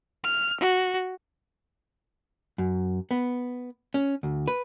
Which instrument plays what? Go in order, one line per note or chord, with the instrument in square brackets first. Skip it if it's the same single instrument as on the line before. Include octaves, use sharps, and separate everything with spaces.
[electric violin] F6
F#4
[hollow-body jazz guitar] F#2
B3
C#4
D2
B4